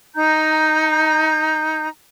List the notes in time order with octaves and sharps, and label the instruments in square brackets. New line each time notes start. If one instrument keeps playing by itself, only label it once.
[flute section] D#4 A#5 G6